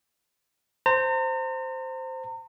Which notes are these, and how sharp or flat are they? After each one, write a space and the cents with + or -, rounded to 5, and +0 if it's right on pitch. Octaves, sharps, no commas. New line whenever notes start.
C5 -5 A#5 -40